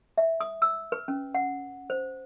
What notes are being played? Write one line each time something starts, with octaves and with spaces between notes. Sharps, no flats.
E5
D#6
E6
B4
C#4
F#5
C5